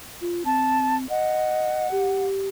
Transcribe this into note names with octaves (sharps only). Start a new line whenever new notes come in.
F4
C4 A5
D#5 F#5
G4